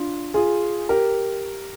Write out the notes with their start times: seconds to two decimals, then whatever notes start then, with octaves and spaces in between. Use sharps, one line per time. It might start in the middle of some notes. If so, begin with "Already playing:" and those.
Already playing: D4 F4
0.34 F4 G#4
0.89 G4 A#4